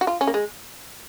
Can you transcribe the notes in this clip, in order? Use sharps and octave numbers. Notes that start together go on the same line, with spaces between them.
F#4
F4
C#4
A#3
G#3